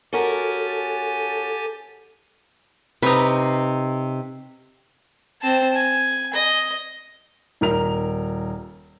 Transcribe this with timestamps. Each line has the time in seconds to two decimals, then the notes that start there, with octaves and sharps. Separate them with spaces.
0.13 C#4 F#4 G4 A4 A#4 G#5
3.03 C3 D#4 B4
5.41 C4 A5
5.75 G#5
6.34 D#5
7.61 D#1 A#4 F7